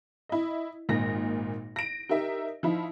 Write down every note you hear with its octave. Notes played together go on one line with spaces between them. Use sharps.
E4 D#5
G#1 A#2 D#4 A#6
A#6 D7
D#4 G4 A#4 E5
F3 D#4 E4